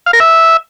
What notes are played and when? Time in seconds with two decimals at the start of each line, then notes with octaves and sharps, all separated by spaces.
0.06 F5
0.13 A#4
0.20 E5